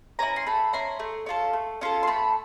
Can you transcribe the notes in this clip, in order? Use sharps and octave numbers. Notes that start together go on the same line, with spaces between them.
C#4 E4 G#5 A#5
C6
A3 A5 B5
C#4 E4 A#5 C6
A3
C#4 F4 A4
A3
C#4 F4 A4
C6
A3 A5 B5